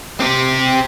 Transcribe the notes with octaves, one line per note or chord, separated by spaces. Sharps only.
C4 G4